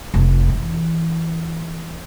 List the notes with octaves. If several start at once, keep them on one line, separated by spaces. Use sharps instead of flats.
F1
E3